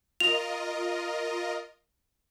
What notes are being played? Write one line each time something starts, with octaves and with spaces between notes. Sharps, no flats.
F4 A#4 D#5 F7